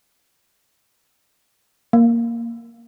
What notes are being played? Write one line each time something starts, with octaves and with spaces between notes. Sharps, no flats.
A#3